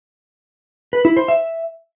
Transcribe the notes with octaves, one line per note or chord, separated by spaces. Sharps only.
B4
E4
C5
E5